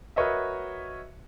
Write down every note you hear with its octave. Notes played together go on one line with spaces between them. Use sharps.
F#4 A#4 B4 C#5 D#5 E5